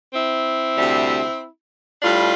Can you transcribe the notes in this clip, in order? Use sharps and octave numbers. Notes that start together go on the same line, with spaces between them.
C4 E4
D2 C3 G3
A2 G3 D4 F4